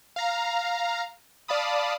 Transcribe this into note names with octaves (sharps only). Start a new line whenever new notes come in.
F5 A#5
D5 F5 A5 B5 D#6